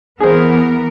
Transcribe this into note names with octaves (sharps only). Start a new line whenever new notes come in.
E3 B3 G#4 A#4 C5